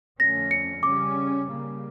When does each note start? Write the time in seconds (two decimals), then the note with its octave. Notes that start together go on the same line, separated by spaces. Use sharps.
0.19 F2 D3 A3 C#4 A#6
0.51 C#7
0.83 C#3 G3 C#4 D6
1.46 C#3 G3 A#3